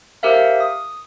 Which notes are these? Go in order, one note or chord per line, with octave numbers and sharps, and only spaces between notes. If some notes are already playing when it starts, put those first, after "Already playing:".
G4 A#4 C5 E5 F5
D#6